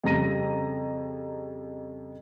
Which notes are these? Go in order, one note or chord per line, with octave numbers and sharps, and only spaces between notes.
F2 C#3 G3 A#5 A#6 D#7